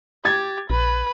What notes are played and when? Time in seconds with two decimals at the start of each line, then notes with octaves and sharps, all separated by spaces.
0.25 G4 G#6 A6
0.70 A#1 B4